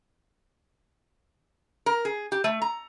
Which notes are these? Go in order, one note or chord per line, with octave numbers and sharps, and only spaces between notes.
A#4
G#4
G4
A3
A#5